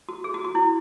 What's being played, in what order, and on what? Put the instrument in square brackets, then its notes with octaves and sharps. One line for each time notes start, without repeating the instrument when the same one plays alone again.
[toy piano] F#4
G#4
F#4
F#4
E4